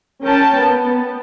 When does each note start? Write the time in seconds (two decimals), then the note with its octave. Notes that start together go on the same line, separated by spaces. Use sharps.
0.22 C#4 A#4 G5 A5
0.57 B3